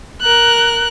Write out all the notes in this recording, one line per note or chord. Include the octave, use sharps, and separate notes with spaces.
A#4 F#6